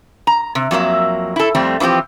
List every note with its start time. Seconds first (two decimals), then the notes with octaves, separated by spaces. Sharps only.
0.27 A#5
0.55 C3
0.71 F2 F#3 A#3 E5
1.36 E4 A4
1.55 F2 G3 A3 C4
1.80 E3 F3 G3 C4 G4